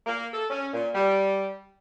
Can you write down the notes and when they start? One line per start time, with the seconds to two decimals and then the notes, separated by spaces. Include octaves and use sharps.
0.07 A#3
0.34 A4
0.50 C#4
0.74 A#2
0.95 G3